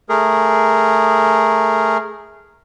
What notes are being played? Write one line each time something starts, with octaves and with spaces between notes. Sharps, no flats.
A3 G#4 A#4